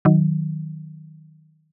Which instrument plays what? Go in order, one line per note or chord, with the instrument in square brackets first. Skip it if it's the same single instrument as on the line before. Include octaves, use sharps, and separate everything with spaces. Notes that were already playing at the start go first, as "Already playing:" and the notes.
[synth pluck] D#3 F#3